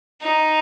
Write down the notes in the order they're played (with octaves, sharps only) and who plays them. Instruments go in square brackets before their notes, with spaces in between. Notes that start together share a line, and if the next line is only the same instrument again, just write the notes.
[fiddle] D#4